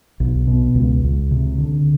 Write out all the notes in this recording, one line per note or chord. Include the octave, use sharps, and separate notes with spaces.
B1
B2
C#2
C#2
C3
D3